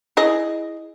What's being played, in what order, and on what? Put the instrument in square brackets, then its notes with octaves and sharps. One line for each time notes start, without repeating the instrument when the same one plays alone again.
[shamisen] E4 G#4 D#5